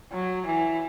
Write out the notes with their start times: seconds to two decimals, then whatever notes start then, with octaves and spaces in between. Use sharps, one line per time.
0.12 F#3
0.46 E3